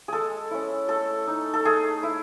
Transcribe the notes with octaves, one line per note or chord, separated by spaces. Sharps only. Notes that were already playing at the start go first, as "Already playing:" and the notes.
G#3 G#4 A4
C#4 E4
A3 A4
D#4
A4
A3 G#4
E4